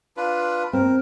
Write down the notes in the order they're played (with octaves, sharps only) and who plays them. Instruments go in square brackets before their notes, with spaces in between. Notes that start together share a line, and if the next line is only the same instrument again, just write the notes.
[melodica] D4 F4 B4
[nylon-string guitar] C4 [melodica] A#4